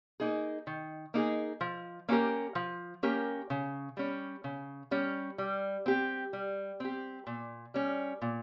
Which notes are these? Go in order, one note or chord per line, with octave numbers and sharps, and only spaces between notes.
A#3 D#4 G#4
D#3
A#3 D#4 G#4
F3
A#3 C#4 G4 A#4
F3
A#3 C#4 G4 A#4
C#3
G3 C#4
C#3
G3 C#4
G3
C4 G4
G3
C4 G4
A#2
G3 C#4
A#2